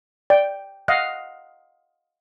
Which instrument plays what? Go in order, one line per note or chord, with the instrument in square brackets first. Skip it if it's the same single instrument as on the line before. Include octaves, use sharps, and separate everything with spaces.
[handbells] D5 [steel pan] G5
[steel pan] D#5 F5 F#5 [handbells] F#6